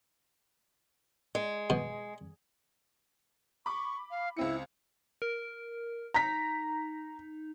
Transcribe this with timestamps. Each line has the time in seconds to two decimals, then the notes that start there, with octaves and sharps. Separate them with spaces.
1.35 G#3
1.70 B2
3.66 B5 C#6 D6
4.11 F5
4.37 C#2 C4 E4 C#7
5.22 A#4
6.14 D#4 A#5 B6